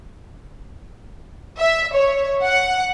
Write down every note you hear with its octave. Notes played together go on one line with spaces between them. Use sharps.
E5
C#5
F#5